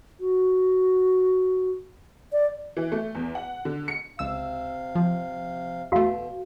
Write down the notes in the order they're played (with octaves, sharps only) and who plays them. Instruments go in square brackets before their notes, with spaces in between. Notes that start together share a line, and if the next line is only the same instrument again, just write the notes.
[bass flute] F#4
D5
[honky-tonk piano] E3
A3
E2
F#5
D3
C#7
[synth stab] C#2 E6 [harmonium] C3 F5
[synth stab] F3
[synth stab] E2 A3 [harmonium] B2 [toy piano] F#4 F5